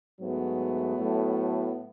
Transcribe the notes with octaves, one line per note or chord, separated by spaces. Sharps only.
G#2 F#3 A3 B3
A2 F#3 A3